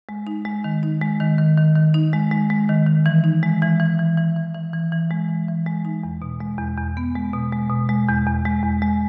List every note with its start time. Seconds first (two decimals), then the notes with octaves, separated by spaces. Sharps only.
0.09 G#3
0.27 D#4
0.45 G#3
0.64 D#3
0.83 D#4
1.01 G#3
1.20 D#3
1.38 D#3
1.57 D#3
1.76 D#3
1.94 D#4
2.13 G#3
2.32 G#3
2.50 G#3
2.69 D#3
2.87 D#3
3.06 E3
3.24 D#4
3.43 G#3
3.62 E3
3.80 E3
3.99 E3
4.17 E3
4.36 E3
4.55 E3
4.73 E3
4.92 E3
5.11 G#3
5.28 E3
5.48 E3
5.66 G#3
5.85 D#4
6.03 E2
6.22 B2
6.40 G#3
6.59 E2
6.77 E2
6.97 B3
7.15 G#3
7.33 B2
7.53 G#3
7.70 B2
7.89 G#3
8.08 E2
8.27 E2
8.45 G#3
8.63 E2
8.82 G#3